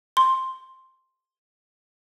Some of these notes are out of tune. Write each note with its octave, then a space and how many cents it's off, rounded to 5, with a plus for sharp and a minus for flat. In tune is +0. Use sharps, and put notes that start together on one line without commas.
C6 +5